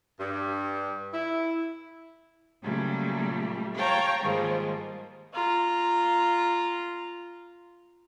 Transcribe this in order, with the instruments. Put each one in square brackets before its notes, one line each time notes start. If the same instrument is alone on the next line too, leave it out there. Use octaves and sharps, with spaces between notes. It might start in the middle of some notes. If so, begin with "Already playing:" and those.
[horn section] G2
E4
[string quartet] A#2 C#3 F#3 G3 A3
C#5 F5 G5 A5 A#5
G#2 D#3 F3 G3 G#3 A#3
[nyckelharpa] F4 A#5